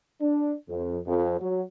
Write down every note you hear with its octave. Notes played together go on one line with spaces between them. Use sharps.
D4
F2
F2
F#3